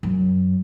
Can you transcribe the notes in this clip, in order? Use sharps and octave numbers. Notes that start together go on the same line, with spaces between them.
F#2